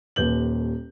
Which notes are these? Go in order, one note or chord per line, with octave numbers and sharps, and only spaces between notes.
D#1 D#2 B4 G6 F#7